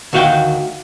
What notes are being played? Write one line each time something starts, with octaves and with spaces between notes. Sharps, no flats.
D2 D#3 F#4 F5 G5